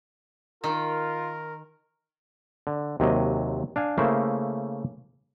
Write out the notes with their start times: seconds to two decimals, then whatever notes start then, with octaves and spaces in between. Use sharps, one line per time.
0.64 D#3 F4 A#4 G5
2.67 D3
3.00 D#2 C3 F#3 D#5
3.76 D4 F5 G#5
3.98 C#3 A3 A#3 E4 C5